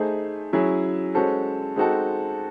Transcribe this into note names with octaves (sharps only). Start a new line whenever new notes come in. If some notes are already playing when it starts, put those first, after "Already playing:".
Already playing: A3 D#4 G#4 C5
F#3 C#4 E4 G#4
G#3 C#4 F#4 A4 C5
G#3 C4 D#4 F#4 A4